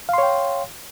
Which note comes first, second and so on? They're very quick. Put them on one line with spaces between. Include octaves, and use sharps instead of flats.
F5 C6 C#5 G5